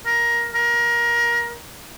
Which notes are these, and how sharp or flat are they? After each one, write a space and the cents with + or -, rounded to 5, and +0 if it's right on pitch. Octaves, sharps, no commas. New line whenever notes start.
A#4 +15
A#4 +25